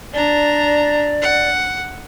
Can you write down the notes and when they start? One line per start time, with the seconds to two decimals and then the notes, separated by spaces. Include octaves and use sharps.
0.13 D4 D5 A#5
1.21 F#5